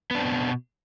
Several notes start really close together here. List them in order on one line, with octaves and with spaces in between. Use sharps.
B3 D4 C4 B2